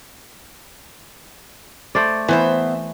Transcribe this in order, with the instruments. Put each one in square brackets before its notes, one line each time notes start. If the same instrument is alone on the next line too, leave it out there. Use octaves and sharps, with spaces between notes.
[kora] A3 C5 D5
[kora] E3 [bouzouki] B3 C5 E5